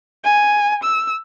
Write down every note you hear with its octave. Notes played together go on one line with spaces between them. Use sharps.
G#5
E6